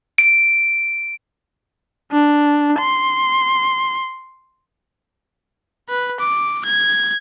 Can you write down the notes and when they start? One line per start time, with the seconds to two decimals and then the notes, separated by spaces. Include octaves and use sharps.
0.18 D7
2.12 D4
2.79 C6
5.89 B4
6.20 D6
6.65 G#6